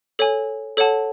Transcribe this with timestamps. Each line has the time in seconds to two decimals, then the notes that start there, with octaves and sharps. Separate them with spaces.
0.19 A4 C#5 G#5
0.77 A4 C#5 F#5 A5